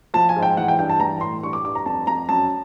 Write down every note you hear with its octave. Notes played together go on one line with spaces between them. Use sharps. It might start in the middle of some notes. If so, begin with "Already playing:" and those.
F3 A5
G#5
G#2
G5
E3 F#5
G5
G2 G5
A5
E3 A#5
A2 C6
G2 C#6
D6
G2 D6
A#5
F2 A5
F2 A#5
F#2 A5